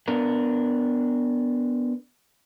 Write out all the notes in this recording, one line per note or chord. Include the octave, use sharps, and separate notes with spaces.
B3 D4 A#4